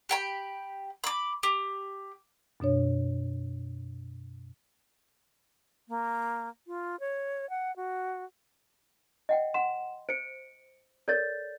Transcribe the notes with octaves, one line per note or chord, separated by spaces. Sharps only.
G4 G5 B5
B5 D6
G4
F#2 B2 D4 C#5
A#3
F4
C#5
F#5
F#4
D#5 F#5 G5
F#5 C6 E7
C5 C#7 D7
A4 A#4 C#5 D5 G6 A6